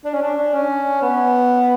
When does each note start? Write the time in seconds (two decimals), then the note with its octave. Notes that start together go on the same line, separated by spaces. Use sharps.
0.05 D4
0.14 C#4
0.22 D4
0.54 C#4
1.02 B3